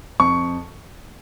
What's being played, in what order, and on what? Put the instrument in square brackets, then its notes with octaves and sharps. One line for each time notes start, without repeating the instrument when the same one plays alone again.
[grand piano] F2 C#6